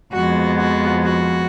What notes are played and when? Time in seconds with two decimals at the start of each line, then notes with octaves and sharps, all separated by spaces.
0.13 F2 F3 G#3 B3 F#4
0.58 F#4
1.03 F#4